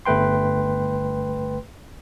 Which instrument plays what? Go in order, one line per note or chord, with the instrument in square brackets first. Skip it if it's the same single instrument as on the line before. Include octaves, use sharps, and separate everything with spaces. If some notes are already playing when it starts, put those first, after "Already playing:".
[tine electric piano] G1 A3 B4 G5 C6